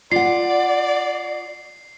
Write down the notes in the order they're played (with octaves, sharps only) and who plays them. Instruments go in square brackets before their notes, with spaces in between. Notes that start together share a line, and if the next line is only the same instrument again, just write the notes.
[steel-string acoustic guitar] F4 F#5 [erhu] D5 [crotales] C7